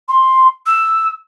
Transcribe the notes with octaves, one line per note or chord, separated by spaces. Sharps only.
C6
E6